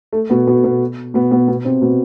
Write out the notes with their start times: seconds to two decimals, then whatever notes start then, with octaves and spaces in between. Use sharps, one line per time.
0.13 A3
0.30 B2 B3
0.47 B2 B3
0.64 B2 B3
1.14 B2 B3
1.31 B2 B3
1.48 B2 B3
1.65 C3 C4
1.82 B2 B3